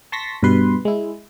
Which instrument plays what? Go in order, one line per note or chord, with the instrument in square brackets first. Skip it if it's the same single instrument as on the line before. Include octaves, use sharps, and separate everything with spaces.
[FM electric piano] A5 C6 C#6 A#6 B6
G2 B2 B4 C6
G#3 E4